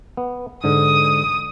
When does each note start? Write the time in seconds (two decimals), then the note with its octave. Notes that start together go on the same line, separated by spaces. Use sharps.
0.17 B3
0.64 G#2 D3 D#6